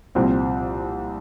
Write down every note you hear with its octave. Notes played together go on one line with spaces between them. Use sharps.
C2 A#2 F3 C4